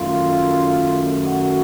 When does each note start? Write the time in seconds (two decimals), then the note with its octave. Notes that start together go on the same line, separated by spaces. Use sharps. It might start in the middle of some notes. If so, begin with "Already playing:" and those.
Already playing: F#2 D#3 A3 F4
1.24 F#4